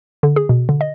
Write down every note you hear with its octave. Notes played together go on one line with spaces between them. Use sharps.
D3
G#4
B2
D3
D#5